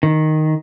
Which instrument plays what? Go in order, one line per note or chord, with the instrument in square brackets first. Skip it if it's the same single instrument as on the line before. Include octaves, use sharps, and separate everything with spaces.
[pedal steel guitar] D#3